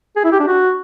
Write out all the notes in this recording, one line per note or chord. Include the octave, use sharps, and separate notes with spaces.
G#4
E4
G4
D4
F#4